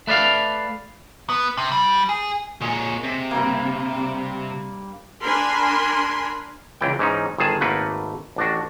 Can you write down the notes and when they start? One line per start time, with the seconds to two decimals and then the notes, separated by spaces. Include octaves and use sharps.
0.07 A3 B4 D5 D#5 F5
1.30 B3
1.57 C3
1.72 G3
2.09 G#4
2.61 A#2 G#3 C#5
3.03 C3
3.31 G2 G3 A#3
3.97 D5
5.23 D4 A#4 G#5 B5 C6
6.81 C#2 E3 G5
6.99 G#2 E3 C#4 D#4
7.38 G1 D#3 G#4 A5
7.61 G#1 A3 A#3 B4 F#5
8.36 A1 D4 F#4